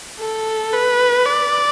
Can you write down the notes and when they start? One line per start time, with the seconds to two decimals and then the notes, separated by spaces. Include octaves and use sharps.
0.20 A4
0.73 B4
1.26 D5